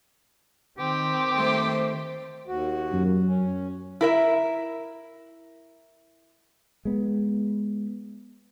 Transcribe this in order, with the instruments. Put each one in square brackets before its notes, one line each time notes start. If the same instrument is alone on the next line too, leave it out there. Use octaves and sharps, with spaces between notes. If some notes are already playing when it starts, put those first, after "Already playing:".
[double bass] D#3 [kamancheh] C4 [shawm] G4
[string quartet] A3 C5
[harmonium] D#2 F#4
[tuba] F#2
[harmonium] C#4
[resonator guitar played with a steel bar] E4 A#4 E5
[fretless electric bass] G#3 B3